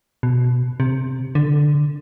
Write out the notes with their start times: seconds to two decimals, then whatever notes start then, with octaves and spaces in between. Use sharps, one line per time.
0.23 B2
0.80 C3
1.35 D3